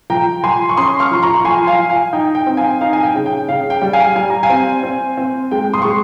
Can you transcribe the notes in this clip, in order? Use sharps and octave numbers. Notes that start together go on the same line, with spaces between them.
F3 G5 A#5
F3 G#5 C6
C#6
C#4 C6 D#6
C#6 F6
F3 C6
A#5 C#6
C#6
F3 G#5 C6
F5 G#5
F3
F5 G#5
D#4 G5
G5
C4
F5 G#5
D#4 F5
G#5
G5
C#3
G5
C#3 F5
G5
G3
F5 G#5
G3 G#5
A#5
F5 G#5
C4
C4
C4
G#3 G5
C6 D#6
C#6
G#3